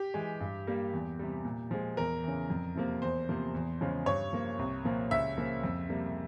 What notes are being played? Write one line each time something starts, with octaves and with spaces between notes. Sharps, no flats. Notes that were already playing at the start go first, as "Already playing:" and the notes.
Already playing: G4
E3 G#3
G2
G3 A#3
E2
C3 G3
A#2
F3 G#3
E2 A#4
C#3 E3
F2
C3 F3 A#3
E2 C5
C3 F3 A#3
E2
C#3 F3 G#3
G2 C#5
F3 A#3
C2
A#2 F3 A#3
C#2 E5
C#3 F3 A#3
F2
C3 G3 A#3